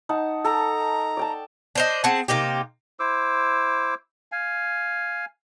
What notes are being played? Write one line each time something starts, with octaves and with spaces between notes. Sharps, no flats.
D#4 F#5 A5
A4 A#5
D5 G5 A5
D4 C5 D#5
C4 G#4 F#5 A5
C3 A#3 D#4 G4
E4 C5 D6 E6
F5 G#5